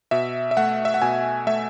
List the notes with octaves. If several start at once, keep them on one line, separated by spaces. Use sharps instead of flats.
B2 E5
E5
A3 F#5
E5
F#5
B2 G#5
A3 E5